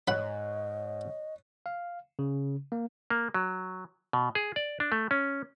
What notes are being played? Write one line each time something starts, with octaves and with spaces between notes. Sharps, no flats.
G#2 C#5 D#5 F#5 B5 F#6
F5
C#3
A#3
A#3
F#3
B2
G#4
D5
D4
A3
C#4